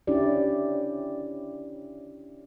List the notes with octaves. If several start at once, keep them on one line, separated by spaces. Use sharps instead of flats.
C#4 D4 E4 G4 D5